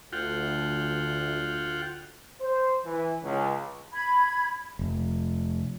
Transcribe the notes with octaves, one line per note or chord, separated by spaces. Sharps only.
D2 F4 F#5 G5
C5
E3
C#2
B5 G#6
F1